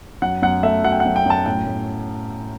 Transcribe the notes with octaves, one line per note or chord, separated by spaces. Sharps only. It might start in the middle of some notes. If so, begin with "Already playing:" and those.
F#2 F#5
F#2 F#5
A3 E5
F#3 F#5
G5
F#5
F#2
G5
F#2 A5
A2 G5
A2